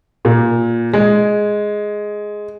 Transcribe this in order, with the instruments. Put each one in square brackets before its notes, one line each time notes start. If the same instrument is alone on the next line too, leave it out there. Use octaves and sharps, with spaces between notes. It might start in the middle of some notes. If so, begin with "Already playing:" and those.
[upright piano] A#2
G#3